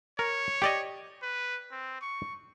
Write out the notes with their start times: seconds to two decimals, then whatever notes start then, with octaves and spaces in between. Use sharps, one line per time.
0.19 A#4 C#5
0.62 G4 D5 D#5
1.23 B4
1.72 C4
2.02 C#6